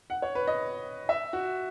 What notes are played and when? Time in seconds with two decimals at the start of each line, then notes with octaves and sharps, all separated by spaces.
0.10 F#5
0.22 C#5
0.35 B4
0.47 D#5
1.09 E5
1.33 F#4